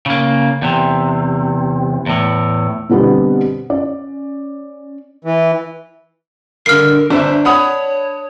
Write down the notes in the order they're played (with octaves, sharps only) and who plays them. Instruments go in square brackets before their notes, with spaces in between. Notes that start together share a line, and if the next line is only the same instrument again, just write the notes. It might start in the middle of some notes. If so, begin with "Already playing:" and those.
[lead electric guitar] C#3 A#3
E2 C3
E2 A2
[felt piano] B2 D3 G3 B3 C4
C#4 D5
[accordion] E3
[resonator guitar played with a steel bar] G2 D3 [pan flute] A#4 [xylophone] F6 C7
[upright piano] G1 E5 [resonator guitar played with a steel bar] D4 [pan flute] C5
[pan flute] C#5 [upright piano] F#5 B5 D#6